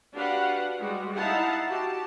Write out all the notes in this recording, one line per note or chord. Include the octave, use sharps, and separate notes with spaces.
D4 F#4 G4 B4 F5 F#5
G3 G#3 F#4
D#4 E4 F5 F#5 A5
F#4 G4 A5